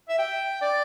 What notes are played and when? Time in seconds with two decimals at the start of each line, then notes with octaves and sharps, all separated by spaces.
0.09 E5
0.19 G5
0.61 D5